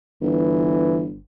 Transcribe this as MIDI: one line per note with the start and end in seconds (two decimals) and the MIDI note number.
0.22 1.20 31
0.22 1.05 52